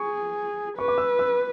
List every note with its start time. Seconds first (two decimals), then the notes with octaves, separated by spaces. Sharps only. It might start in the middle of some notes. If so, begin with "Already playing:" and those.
Already playing: G#4 C#6
0.77 B4 C#6
0.88 D6
0.98 E6
1.19 E6